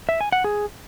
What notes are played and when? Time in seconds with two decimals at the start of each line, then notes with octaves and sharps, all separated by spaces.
0.09 E5
0.21 G#5
0.32 F#5
0.44 G#4